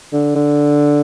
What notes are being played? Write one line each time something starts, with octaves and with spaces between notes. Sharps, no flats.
D3
D3